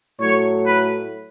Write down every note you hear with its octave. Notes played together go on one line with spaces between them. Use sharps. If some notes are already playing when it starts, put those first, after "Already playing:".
A2 F#3 A3 C#5
B4